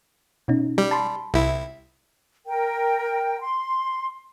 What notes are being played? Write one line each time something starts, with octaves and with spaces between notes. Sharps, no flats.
B2 C#4 D#4
G3
A5 B5 C6
C2 E4
A#4 G5
C6